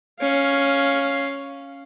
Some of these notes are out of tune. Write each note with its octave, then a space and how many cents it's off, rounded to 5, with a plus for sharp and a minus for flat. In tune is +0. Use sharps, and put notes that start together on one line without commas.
C#4 +0 F5 +0